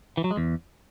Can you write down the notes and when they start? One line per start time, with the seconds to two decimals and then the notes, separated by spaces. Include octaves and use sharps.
0.17 E3
0.24 F#3
0.31 G#3
0.37 E2